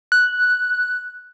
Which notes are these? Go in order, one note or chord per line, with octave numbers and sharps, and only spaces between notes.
F#6